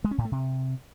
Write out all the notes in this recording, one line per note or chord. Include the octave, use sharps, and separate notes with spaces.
G#3
C#4
A2
A3
C3